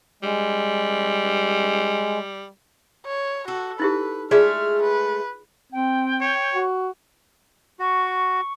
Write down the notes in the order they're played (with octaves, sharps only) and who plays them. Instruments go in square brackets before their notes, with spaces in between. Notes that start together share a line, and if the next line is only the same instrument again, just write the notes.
[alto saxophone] G3 [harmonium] G#3
[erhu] C#5
[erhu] F#4 [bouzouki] A4
[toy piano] D#4 E4 G4 [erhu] B4
[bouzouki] G#3 A3 E5 [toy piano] F4 G#4 D5 [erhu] F6
[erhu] B4
[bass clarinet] C4 [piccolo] G5
[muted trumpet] C#5
[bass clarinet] F#4
[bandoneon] F#4 [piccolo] C#6